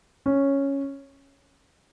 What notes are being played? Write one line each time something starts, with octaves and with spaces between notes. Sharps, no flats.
C#4